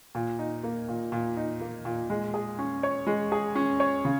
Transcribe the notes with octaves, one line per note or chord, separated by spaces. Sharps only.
A#2
D#4
A#3
A#2
A#2
D#4
A#3
A#2
G#3
G#4
C#4
C#5
G#3
G#4
C#4
C#5
C#3